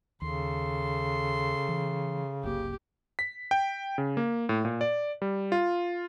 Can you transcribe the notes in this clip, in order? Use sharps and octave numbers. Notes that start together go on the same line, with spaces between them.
D#2 C#3 A4 C6
E3
F#1 C2 A#3 G4
B6
G5
C#3
A#3
A2
A#2
D5
G3
F4